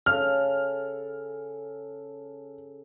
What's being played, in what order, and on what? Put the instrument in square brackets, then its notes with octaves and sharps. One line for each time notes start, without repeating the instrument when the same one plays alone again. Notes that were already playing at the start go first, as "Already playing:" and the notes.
[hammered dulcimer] C#3 A4 [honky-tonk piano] F6